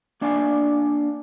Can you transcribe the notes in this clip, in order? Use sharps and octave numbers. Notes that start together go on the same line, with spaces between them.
A#3 D4 D5 F5 G#5